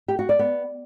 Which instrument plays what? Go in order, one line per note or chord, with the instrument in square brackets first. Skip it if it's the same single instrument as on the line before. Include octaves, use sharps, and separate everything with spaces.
[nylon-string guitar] G4
F#4
D5
B3